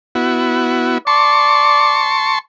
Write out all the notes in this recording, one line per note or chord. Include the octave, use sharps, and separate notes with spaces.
B3 E4 F#4
D5 A5 C6 C#6